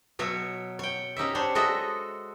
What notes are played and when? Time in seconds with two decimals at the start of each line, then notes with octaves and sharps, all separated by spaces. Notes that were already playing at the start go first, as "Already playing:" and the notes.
0.19 B2 F#3 C#5 E5
0.79 C#5 G5
1.16 C#4 D#4 G4 E5
1.35 D4 C5 C#5
1.55 G#3 F#4 A4 D#5 E5